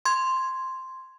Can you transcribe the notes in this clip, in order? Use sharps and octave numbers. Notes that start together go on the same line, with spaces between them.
C6 G#6